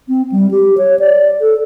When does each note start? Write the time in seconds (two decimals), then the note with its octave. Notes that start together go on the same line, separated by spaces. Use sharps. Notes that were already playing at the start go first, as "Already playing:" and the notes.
0.09 C4
0.32 G3
0.51 G4
0.78 C#5
0.99 D5
1.41 A4